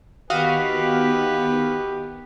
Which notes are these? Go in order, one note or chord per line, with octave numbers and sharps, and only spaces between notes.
D#3 B3 F#4 G4 B4 D#5 F5